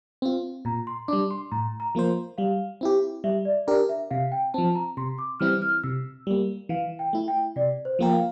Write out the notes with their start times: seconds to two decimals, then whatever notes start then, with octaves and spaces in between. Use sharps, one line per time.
0.22 C4 F4
0.65 A#2 A#5
0.87 C6
1.08 G3 D4 D6
1.31 C6
1.52 A2 A#5
1.80 A#5
1.95 F3 A#3 F4 C5
2.38 G3 F5
2.81 C4 E4 G4
3.24 G3 E5
3.45 D5
3.67 D4 G4 A#4 D5
3.89 E5
4.11 C3 F5
4.32 G5
4.54 F3 C4 A5
4.75 A#5
4.97 C3 C6
5.18 D6
5.40 E3 G3 C4 E4 F6
5.62 F6
5.84 C3 E6
6.27 G3 A#3
6.69 E3 F5
6.99 G5
7.13 A3 E4
7.28 G5
7.56 C3 D5
7.85 C5
7.99 F3 A#3 F4 A#4 G5
8.13 F5